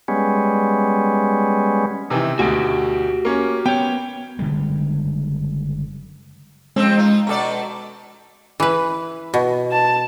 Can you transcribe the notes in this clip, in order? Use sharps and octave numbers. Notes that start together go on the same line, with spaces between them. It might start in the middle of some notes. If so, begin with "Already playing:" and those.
G3 G#3 B3 C#4
C3 D#3 E3
D2 B2 F#4 G4
A#3 C#4
B3 C#5 G5
F#1 D3 G3 G#3
F2 F3 G#3 C4 E6
D#4 F4
B2 A4 D5 A#5 C#6 D6
E3 B4
B2
A5